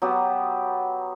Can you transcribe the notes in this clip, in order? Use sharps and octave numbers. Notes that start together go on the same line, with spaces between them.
F#3 B3 G4